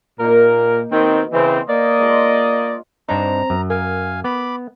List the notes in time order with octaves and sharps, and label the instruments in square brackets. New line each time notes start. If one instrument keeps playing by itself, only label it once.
[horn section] A#2 A#4 [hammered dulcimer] A#3 D#4
[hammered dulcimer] B2 [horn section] D#3 C4
[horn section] C#3 E3 C4 [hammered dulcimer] C5
[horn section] A#3 D5 D#5
[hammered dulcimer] G#3 D4 F4
[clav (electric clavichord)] G2 D4 D#4 [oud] C4 C#5 [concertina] A#5
[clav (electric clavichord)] F#2
[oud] A#4 [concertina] F5 G#5
[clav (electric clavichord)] B3 [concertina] B5 D6